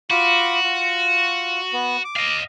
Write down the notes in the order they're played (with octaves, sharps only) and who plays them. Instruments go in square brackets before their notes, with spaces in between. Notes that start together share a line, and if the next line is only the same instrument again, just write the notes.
[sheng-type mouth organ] F4 B5 D6 [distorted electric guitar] F#4
[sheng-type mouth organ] F4
B3
D6
[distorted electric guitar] D#5 F5